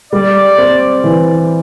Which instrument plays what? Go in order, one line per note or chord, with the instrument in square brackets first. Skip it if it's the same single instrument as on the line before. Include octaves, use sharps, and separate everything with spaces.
[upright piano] G3 [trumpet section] D5
[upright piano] C4
E3